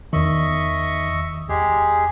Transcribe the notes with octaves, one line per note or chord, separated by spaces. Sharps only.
E2 D#3 D#5 E5 C#6
E2 G#3 G4 G#4